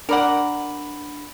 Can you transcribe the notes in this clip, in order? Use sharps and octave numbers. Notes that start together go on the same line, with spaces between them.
D4 A#4 D5 F#5 B5 F#7